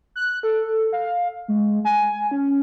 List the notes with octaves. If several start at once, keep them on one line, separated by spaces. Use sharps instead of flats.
F#6
A4
F5
G#3
G#5
C#4